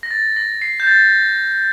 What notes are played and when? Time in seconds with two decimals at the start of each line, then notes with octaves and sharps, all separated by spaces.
0.03 A#6
0.11 A6
0.36 A#6
0.62 C7
0.80 G6
0.87 A6